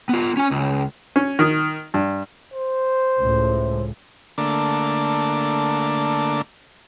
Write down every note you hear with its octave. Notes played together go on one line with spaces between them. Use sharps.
B3 F4
C#4 G#5
C#2
C#4
D#3
G2
C5
C#2 A2
D3 A3 A#3 D4